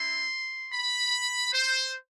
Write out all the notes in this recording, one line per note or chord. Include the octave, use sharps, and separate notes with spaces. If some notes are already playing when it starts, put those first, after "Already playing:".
Already playing: C4 E4 C6
B5
C5